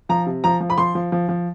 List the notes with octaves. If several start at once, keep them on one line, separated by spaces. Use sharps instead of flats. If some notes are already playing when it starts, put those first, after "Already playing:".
F3 A#5
C3
F3 A#5
F3
B5
F3 C6
F3
F3
F3